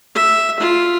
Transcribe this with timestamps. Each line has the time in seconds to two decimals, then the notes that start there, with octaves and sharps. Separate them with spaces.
0.15 E5
0.60 F4